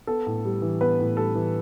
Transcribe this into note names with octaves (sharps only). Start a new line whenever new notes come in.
B3 A4
A2
G3
E3
B3 B4
A2
G3 A4
E3